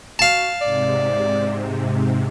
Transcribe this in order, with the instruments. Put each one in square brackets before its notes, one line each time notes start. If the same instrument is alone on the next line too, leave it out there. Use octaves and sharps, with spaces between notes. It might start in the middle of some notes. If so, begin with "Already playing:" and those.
[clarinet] F#4 [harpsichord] F5 A5
[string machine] G#2 C3 [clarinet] D5